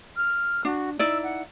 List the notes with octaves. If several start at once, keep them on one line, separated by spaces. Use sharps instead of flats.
F6
D4 F#4
D#4 E4 D5 E6
F#5